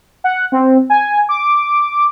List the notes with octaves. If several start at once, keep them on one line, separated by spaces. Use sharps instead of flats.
F#5
C4
G#5
D6